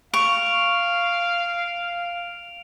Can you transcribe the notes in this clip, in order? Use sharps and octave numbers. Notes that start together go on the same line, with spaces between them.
F5 C#6 D7 F7